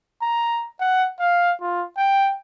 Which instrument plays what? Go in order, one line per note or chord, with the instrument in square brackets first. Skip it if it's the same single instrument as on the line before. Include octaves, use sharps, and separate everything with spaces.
[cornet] A#5
F#5
F5
F4
G5